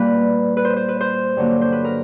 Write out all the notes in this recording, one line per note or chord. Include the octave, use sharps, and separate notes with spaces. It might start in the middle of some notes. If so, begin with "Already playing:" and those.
Already playing: A#2 G3 A#3 B4
B4
C5
C5
B4
C5
G2 D3 F#3 A#3
C5
B4
A#4